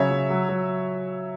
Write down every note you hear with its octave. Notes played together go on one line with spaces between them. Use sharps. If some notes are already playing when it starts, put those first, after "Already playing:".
Already playing: C#3 F#3 C#5 E5
C#3
F#3
F#3